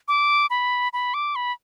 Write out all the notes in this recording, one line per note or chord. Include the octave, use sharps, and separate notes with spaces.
D6
B5
B5
D6
B5